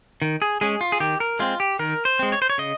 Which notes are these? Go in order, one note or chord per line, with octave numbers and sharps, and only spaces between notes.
D#3
G#4
G#3 C#4 G#4
F4
G#4
D#3 G4
A#4
G#3 C4 F4
G4
D#3 A#4
C5
G#3 C4
C#5
C5
C#5
C#3 D#5